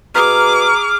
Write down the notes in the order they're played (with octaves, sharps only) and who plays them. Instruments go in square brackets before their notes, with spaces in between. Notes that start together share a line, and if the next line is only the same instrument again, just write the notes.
[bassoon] B2 [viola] G#4 D6 [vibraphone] A#5 D#6 [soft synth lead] F6